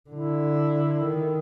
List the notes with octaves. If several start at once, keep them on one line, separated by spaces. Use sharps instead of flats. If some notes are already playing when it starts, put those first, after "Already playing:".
D3 E4
D#3